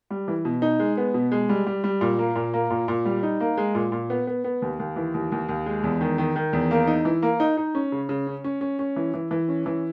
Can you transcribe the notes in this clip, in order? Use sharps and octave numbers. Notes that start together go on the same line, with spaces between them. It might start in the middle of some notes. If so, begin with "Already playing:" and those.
G3
E3
B2
D#4
G#3
B3
B2
G#3
G3
G3
G3
A#2
A#3
A#2
A#3
A#2
A#2
G3
D#4
A#3
G#3
A#2
A#2
B3
B3
B3
D#2
D#2
E3
D#2
D#2
D#2
G#3
E2
D#3
D#3
D#3
E2
A#3
D#4
E3
A#3
D#4
D#4
C#4
C#3
C#3
C#4
C#4
C#4
C#4
E3
E3
E3
C#4
E3